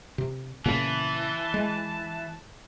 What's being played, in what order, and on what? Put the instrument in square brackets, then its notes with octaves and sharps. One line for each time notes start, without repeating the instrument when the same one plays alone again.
[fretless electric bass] C3
[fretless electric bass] A#2 C#3 B3 [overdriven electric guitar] E3 [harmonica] A5
[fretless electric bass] G#3